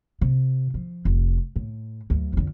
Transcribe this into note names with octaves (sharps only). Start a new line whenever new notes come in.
C3
F3
F1
A2
D2 F#3
F2 D3